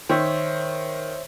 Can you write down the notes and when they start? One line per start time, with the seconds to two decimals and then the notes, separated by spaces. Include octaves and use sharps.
0.09 D#3 C5 C#5 E5